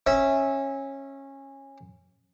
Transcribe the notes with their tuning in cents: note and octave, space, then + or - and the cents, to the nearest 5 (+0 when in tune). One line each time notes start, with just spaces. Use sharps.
C#4 -20 E5 -15